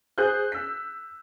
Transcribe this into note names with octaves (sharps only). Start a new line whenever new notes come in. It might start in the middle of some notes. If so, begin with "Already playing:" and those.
G#4 C5 F#6 G6
E6 B6